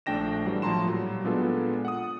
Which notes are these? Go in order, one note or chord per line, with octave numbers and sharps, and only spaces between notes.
A#1 A3 D4 G5 A#6 E7
E3 F#3 G3 D4
A2 F3 A5 A#5 C6 E7
A#2 F#3 G3
A#2 G#3 B3 D4 F4 A4
F#5 D#6